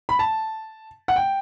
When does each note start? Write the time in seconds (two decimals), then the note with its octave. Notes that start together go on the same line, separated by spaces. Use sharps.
0.09 B5
0.19 A5
1.08 F#5
1.16 G5